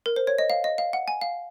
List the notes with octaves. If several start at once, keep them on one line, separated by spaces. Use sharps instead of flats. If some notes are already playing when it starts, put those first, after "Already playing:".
A#4
C5
C#5
D#5
F5
D#5
F5
F#5
G#5
F5